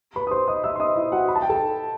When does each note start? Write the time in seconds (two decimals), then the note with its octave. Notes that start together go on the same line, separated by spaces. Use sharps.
0.16 B4 B5
0.27 D#6
0.31 C5 C6
0.48 D#5 D#6
0.64 E5 E6
0.75 C6
0.80 D#5 D#6
0.96 E4 E5
1.12 F#4 F#5
1.28 B5
1.35 A5
1.42 G5
1.50 A4 A5